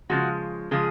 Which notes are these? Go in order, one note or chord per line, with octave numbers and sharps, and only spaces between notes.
C#3 F3 G#3 F#4
C#3 F3 G#3 G#4